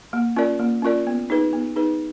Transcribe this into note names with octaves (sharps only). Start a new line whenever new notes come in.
A#3
C#4 F4 A#4 D5
A#3
C#4 F4 A#4 D5
B3
D#4 G#4 B4
B3
D#4 G#4 B4